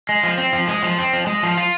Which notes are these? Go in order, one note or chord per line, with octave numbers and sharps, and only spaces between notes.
G#3
F3
C4
F3
G#3
F3
C4
F3
G#3
F3
F4